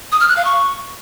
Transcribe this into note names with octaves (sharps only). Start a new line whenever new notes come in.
D#6
F6
F#6
F5
C#6